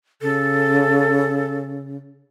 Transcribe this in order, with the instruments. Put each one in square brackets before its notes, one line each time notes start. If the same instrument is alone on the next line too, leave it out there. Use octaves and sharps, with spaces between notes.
[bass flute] C#3 [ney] A4